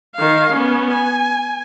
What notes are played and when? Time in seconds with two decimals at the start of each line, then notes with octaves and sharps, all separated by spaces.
0.16 D#3 F5
0.52 B3 C#4
0.92 G#5